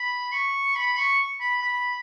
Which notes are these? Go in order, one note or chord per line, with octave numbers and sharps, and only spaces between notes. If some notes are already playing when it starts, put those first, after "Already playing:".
Already playing: B5
C#6
B5
C#6
B5
B5